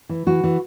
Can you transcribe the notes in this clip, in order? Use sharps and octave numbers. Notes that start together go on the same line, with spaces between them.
E3
E3 F#4
E3